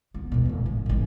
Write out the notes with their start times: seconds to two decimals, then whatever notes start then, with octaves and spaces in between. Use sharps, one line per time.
0.14 B3
0.32 E1 B2
0.45 D1 C#2
0.66 G#1
0.86 D#1 G#1